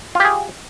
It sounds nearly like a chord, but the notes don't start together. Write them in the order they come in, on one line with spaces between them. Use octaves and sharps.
F4 G4 G#4